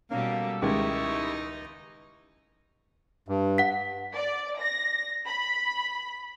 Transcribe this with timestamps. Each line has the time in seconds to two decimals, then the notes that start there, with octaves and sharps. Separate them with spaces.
0.11 B2 G3 A#3 C#4 A4
0.62 C#2 D#3 G#3 D#4 E4 G4 C#6
3.28 G2
3.58 F#5 B6
4.15 D5
4.60 A#6
5.26 B5